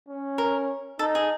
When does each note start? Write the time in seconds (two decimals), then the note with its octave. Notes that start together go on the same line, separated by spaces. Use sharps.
0.09 C#4
0.38 A#4
0.99 D#4 A4
1.15 G#4